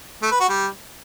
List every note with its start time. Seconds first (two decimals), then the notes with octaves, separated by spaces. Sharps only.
0.22 A3
0.31 B4
0.40 F#4
0.49 G3